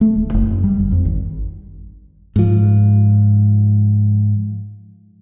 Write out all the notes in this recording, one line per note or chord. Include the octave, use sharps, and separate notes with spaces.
A3
D1
F#1
F#2
G3
G1
F2
G#1
G#2 F3